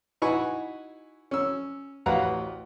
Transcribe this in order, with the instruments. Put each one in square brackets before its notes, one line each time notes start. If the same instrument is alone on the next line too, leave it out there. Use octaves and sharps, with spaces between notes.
[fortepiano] D#4 E4 F#4 B4 G#5 C#6
C#4 E6
A1 D2 B4 F5 F#5 A#5